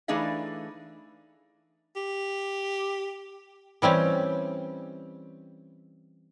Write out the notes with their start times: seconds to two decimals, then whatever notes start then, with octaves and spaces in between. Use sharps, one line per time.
0.08 E3 A3 D4 D#4 G#4 F5
1.96 G4
3.82 E3 G3 C4 C#4